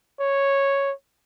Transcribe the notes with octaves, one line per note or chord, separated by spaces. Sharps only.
C#5